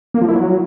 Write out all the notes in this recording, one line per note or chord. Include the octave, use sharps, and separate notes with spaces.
A#3
F3
E4
F#3